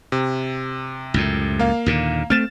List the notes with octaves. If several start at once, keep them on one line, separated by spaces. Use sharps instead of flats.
C3
C#2 F#2 A2
A#3 F5
D#2 A#2 D3
A3 C4 F6 A6 E7